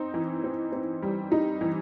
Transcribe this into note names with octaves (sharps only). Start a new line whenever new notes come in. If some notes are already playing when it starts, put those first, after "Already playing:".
Already playing: C4 D#4
E3
C4
C4
G3
D#4
E3